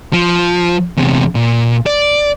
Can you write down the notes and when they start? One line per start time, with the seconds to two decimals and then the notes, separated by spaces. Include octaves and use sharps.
0.13 F3
0.97 E2 C3
1.35 A#2
1.86 D5